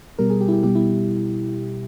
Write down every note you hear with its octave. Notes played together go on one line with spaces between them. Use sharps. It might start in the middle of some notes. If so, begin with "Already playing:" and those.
B2 G3 A#4
G#4
G4
E4
G4
B2 G3 G4
E4